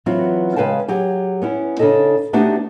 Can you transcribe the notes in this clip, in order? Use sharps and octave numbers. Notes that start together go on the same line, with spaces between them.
E3 F#3 B3 C4 F4 F#4
C#3 G#3 B4 F5 G5 A5
F#3 G4 G#4
B3 C#4 E4
C#3 D4 D#4 A4 D#5
A3 B3 D4 D#4 F#4 G4